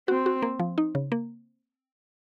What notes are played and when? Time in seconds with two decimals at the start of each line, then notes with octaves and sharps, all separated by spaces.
0.08 C4 F#4
0.26 F#4
0.42 A#3
0.59 F3
0.78 D#4
0.95 C#3
1.12 A#3